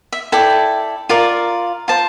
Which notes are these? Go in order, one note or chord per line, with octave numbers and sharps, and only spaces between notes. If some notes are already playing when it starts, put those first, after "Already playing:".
E5
E4 A4 D5 G5
F4 A#4 D5
F4 C5 A5